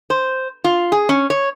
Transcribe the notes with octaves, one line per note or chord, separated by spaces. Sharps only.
C5
F4
G#4
C#4
C#5